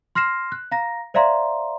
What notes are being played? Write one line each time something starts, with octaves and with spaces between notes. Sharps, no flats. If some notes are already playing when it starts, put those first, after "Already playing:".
C6 F6 A#6 C7 E7
F#6
F5 A#5 A#6
C5 D5 E5 F5 A#5 C6